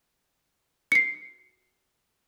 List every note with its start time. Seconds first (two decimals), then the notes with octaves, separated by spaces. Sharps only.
0.92 C7 C#7